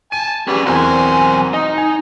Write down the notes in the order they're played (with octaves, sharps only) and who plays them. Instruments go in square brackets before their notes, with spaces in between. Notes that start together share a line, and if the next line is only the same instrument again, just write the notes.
[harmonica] G#5 A5 [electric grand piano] D#7
[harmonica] G3 G#4 [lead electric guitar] C#4 B4
[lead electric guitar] B1 G#5 [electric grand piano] E2 C4 [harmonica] F#4 A#4 C5
[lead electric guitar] D#4 [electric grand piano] D#5
[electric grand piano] G#5